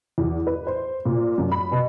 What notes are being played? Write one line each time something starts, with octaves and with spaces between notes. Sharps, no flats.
E2
B4
C5
A#2
F#2
B5
B2